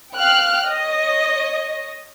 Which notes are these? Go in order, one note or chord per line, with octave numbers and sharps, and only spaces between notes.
F5 G5 F6 F#6
C#5 D#5